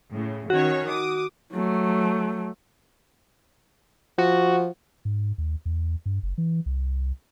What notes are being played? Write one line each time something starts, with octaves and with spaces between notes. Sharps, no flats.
A2 C#3
D#3 C#4 F#4 C#5
D6 D#6
F#3 A3
F3 F#4
G#2
D#2
E2
G2
F#1
E3
C2